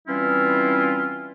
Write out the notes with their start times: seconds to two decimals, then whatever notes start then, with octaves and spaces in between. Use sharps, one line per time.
0.08 E3 G3 C4 C#4 E4 F4